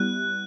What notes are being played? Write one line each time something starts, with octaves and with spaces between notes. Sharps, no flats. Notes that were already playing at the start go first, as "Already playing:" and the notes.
Already playing: G3 B3 E4 F#6